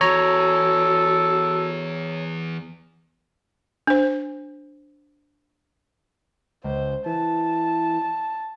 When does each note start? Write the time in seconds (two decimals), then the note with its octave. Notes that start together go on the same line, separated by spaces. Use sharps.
0.01 E2 F#4 A4 C#5 A#5
3.87 D4 C5
6.64 C#2 C5
7.06 E3 A5